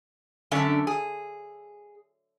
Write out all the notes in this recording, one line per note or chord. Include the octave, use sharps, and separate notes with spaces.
F#2 D3 C#4 D4 E5
G#4